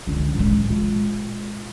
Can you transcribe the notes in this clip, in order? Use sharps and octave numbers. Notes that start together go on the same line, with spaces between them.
C#2 D3
A2 G#3
A#2 G#3